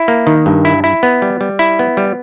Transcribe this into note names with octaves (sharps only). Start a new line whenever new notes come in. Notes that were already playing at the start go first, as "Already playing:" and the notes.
Already playing: E4
A#3
D#3
G2
E4
E4
B3
G3
G3
E4
B3
G3